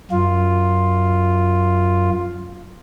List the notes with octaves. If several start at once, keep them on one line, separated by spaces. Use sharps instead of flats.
F#2 F4